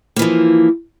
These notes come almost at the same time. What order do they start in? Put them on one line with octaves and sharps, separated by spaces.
A#3 E3 F3